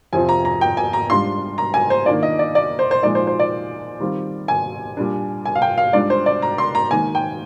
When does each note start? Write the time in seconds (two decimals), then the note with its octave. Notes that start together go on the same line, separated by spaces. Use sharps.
0.13 F2 C3 F3 C4 F4 G#5
0.29 A#5
0.45 A#5
0.61 G5
0.77 G#5
0.93 A#5
1.10 G#2 G3 D4 F4 C6
1.58 A#5
1.74 G#5
1.90 C5
2.06 D#3 A#3 D4 F4 D5
2.23 D#5
2.39 D5
2.55 D5
2.79 C5
2.91 C5
3.03 A#2 F3 G#3 D#4 D5
3.15 C5
3.27 C5
3.39 D5
4.00 D#3 G3 C4 F4
4.48 G#5
4.97 A#2 G3 D4
5.45 G#5
5.55 F5
5.62 G5
5.78 F5
5.93 G#2 G3 D4 F4 D5
6.10 C5
6.26 D5
6.42 A#5
6.58 C6
6.75 A#5
6.91 G#2 D#3 A#3 G#5
7.15 G5